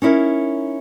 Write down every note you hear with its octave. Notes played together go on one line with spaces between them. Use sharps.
C#4 D#4 E4 A#4